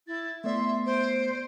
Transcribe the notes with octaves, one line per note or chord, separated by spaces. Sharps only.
E4 A6
A3 B3 D5 E5 C6
C5 D7